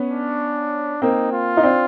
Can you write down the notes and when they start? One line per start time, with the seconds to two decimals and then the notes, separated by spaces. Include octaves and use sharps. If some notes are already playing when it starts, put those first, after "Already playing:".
Already playing: B3 C#4
0.11 D4
1.02 A#3 C4 D#4
1.33 F4
1.57 D#4
1.63 C4 D4